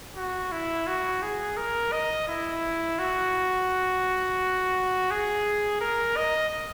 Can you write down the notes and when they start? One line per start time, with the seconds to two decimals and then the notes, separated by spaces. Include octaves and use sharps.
0.16 F#4
0.52 E4
0.87 F#4
1.22 G#4
1.57 A#4
1.92 D#5
2.28 E4
2.99 F#4
5.11 G#4
5.81 A#4
6.17 D#5